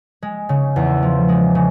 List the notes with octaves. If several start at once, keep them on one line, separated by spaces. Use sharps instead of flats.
G#3
C#3
E2
F3
G#3
C#3